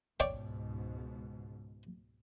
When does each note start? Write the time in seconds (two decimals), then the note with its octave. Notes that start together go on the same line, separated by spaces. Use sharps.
0.20 C#2 G#2 B2 C#5 D5 G5